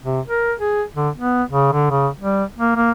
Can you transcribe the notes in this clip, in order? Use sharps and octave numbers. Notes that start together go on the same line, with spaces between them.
C3
A#4
G#4
D3
B3
C#3
D3
C#3
G3
A#3
A#3